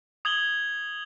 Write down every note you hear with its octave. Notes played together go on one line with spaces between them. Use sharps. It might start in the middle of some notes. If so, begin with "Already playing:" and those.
D#6 G#6 F#7 G7